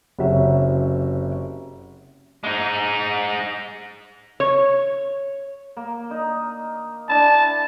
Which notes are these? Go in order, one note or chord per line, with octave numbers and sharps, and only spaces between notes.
F#1 C3 C#4 F#4 E5
G#3 D#4
C#5
A#3
D#4 D#5
D4 E4 A5